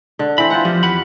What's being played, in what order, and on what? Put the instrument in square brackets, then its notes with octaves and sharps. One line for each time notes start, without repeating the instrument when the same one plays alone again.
[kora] D3
[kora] E3 C4 [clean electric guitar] B5
[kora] F4 C5 F#5
[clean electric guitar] F3 [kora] G4
[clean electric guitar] E2 F#5 B5